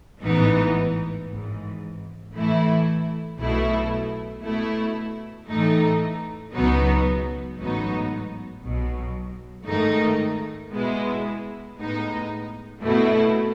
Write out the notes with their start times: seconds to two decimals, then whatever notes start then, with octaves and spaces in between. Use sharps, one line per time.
0.23 A1 G#2 E3 B3 D#4
1.28 G#1 G#2 E3
2.34 A2 E3 A3 E4
3.38 B1 B2 A3 E4
4.43 B2 A3 E4
5.48 A2 E3 A3 D#4
6.53 C#2 B2 F#3 B3 D#4
7.57 A1 G#2 F#3 B3 D#4
8.63 B1 B2 F#3
9.67 G#2 D#3 A3 D#4
10.72 B2 G#3 B3 E4
11.76 A2 G#3 B3 D#4
12.82 B2 A3 E4